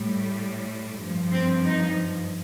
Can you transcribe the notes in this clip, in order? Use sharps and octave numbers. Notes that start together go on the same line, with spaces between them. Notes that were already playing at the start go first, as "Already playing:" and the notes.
Already playing: A2 G3
G2 F3
C4
D#4